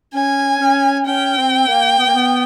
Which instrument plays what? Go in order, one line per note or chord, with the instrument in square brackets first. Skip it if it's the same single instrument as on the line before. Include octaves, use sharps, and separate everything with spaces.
[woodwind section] C#4 [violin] G#5
[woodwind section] C#4
[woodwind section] C#4 [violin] G5
[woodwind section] C4
A#3
B3
A#3
B3